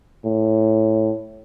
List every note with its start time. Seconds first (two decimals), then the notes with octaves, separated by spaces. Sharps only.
0.25 A2